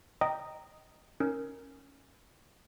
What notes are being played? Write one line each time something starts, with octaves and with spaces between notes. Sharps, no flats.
D#5 G5 A#5 D#6
C#4 D#4 A#4